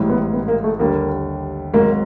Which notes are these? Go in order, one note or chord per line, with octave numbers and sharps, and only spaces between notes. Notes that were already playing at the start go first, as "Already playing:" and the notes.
Already playing: A1 G#2 E3 G3
B3
B3
A#3
A3
D#2 D3 G3 A#3
G#1 G#2 D#3 F#3 A#3